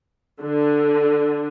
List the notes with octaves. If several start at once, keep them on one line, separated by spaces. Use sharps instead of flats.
D3